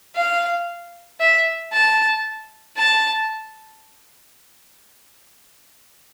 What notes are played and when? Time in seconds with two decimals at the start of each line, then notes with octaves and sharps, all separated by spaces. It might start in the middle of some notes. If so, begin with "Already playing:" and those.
0.16 F5
1.20 E5
1.73 A5
2.77 A5